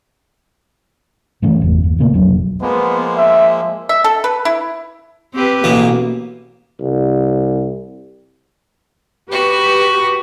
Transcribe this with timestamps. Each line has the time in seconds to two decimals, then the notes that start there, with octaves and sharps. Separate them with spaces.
1.42 G2 E3 A3 C#4
1.62 G1 E2
1.84 D#2
1.99 A#2 C#3 A3 A#3
2.14 F1 B1 F#3 D4
2.62 F3 G#3 A#3 B3
3.17 E5
3.89 E5
4.04 A4
4.24 B4
4.45 E4
5.34 C4 G4 B4
5.64 A1 B2 E3 A#3
6.80 C2
9.31 F#4 G4 B4